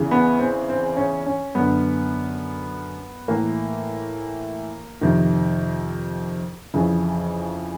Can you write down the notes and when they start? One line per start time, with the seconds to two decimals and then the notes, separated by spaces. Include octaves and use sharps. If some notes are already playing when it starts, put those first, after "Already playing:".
Already playing: E2 C#3 E3
0.11 B3
0.39 C4
0.69 C4
0.97 C#4
1.26 C#4
1.55 F#2 D3 B3
3.28 A2 E3 A#3
5.01 F2 C3 D#3
6.74 F2 C#3 E3